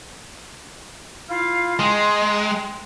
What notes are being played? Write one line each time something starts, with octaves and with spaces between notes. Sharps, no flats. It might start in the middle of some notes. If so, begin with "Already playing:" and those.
E4 F4 F5
G#3 G5 A#5 C6